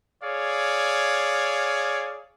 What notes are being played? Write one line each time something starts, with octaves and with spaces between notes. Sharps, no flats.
G#4 C#5 D5 F5